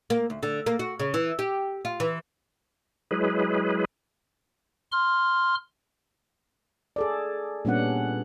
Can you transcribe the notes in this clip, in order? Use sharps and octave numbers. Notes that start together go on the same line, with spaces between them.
A#3
D2
D3
A#3
F#4
C#3
E3
G4
F4
E3
F#3 G#3 E4 G#4 B4
C6 F6
G#4 A4 D5
A#2 G3 B3 C#4 D4 F#5